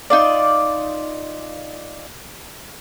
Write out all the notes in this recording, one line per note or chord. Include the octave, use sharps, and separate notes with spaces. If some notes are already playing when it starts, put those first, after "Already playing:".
D#4 F4 D5